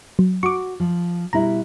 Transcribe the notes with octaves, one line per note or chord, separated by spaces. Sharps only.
F#3
F#4 C#6 D6
F3
B2 G3 E4 A#5